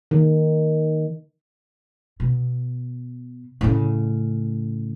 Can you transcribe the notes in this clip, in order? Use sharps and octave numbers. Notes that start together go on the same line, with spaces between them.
D#3
B2
A2 C#3